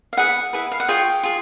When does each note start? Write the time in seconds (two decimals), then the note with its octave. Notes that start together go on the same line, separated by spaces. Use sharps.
0.13 F5
0.17 E4 G#4 B4 F#5
0.53 E4 G#4 B4
0.72 F5
0.80 F#5
0.88 F4 G#4 C#5 G5
1.23 F4 G#4